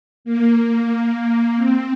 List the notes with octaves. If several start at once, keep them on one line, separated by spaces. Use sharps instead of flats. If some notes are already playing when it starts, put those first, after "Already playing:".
A#3
A#3
C4